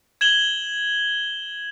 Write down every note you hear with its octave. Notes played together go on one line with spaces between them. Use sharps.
G#6 E7 F#7 G7